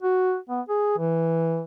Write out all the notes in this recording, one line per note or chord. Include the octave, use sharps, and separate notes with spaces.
F#4
B3
G#4
E3